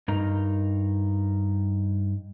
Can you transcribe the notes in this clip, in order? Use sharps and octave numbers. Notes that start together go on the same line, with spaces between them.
G2 D#4 A#4 A#5